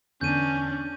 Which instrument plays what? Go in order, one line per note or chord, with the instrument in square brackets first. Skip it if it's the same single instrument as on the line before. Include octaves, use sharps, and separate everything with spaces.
[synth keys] E2 D3 B3 [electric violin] C#4 D4 [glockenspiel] G6 D#7